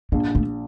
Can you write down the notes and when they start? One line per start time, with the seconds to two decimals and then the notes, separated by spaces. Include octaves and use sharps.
0.12 A#1 A#3
0.35 A3